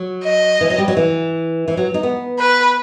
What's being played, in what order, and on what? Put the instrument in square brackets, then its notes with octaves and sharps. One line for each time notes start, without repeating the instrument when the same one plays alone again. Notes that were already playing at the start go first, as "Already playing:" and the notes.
Already playing: [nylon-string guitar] F#3
[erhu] D#5
[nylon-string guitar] E3
F#3
G3
F#3
E3
E3
F#3
D#4
B3
[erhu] B4